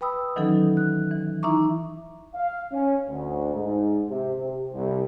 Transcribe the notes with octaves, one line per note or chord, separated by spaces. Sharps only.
B4 G5 B5 D#6 E6
D#3 E3 F#3 C#4 D#4 A4
F#6
E3
D#4 E4 E5 A#5 C#6 D6
F5
C#4
D2
G#2
C3
C3
C2